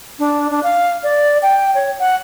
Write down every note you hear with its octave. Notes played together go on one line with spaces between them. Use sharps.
D4
D4
F5
D5
G5
C#5
F#5